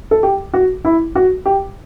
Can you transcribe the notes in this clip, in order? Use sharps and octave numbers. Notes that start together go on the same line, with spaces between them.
A4
G4
F#4
E4
F#4
G4